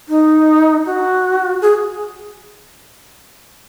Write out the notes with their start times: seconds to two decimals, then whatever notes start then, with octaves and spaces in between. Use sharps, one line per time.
0.09 D#4
0.86 F#4
1.62 G#4